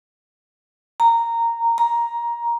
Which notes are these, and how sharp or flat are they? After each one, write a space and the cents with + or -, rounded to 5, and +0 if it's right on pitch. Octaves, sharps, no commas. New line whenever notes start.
A#5 -10
A#5 +10